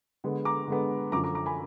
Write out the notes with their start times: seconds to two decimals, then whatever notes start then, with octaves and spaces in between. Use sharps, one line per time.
0.24 D3 G#3 B3
0.45 A#5 D6
0.68 D3 G#3 B3
1.12 F#2 D3 F3 A#5 D6
1.24 A#5 D6
1.35 A#5 D6
1.46 G#5 B5